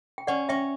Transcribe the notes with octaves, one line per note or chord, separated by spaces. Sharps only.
G5
C#4 D5 F#5
C#4 E5 G5